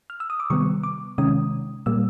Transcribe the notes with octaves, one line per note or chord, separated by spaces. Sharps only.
F6
E6
D#6
D6
C3 D#3 G3 B3 C#6
D6
C3 D#3 G#3 C#4 D#6
A#2 G3 A#3 E6